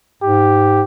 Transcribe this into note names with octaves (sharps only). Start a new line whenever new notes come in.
G#2 G4